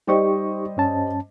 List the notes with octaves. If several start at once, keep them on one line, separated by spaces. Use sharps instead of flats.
G3 D#4 G4 C5 D#5 C#6
G2 C#4 A5